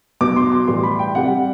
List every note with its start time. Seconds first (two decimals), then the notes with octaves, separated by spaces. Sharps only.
0.21 B2 F#3 D6
0.36 C6
0.52 D6
0.67 A2 E3 G3 C6
0.83 B5
0.99 G5
1.15 C3 G3 F#5